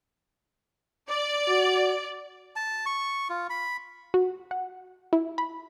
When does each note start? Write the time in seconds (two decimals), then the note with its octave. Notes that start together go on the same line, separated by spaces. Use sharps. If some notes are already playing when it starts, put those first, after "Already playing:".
1.10 D5
1.48 F#4
2.56 A5
2.86 C#6
3.30 F4
3.50 B5
4.14 F#4
4.51 F#5
5.13 E4
5.38 B5